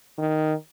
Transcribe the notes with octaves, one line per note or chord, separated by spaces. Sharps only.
D#3